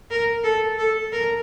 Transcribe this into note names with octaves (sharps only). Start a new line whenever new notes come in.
A#4
A4
A4
A#4